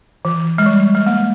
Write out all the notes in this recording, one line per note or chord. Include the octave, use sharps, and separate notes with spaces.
E3
G#3
G3
G#3
A#3